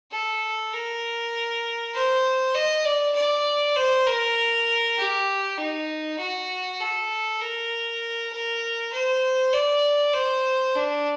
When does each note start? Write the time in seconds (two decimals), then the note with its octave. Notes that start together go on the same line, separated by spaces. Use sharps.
0.12 A4
0.72 A#4
1.94 C5
2.55 D#5
2.85 D5
3.15 D5
3.76 C5
4.07 A#4
4.97 G4
5.58 D#4
6.19 F#4
6.80 A4
7.41 A#4
8.32 A#4
8.92 C5
9.53 D5
10.13 C5
10.75 D4